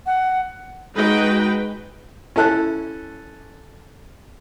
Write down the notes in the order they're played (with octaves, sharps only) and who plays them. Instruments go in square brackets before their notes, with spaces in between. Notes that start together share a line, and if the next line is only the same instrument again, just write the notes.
[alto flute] F#5
[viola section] G#3 D#4 F#4 B4 G5
[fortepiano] C#4 E4 A4 F#6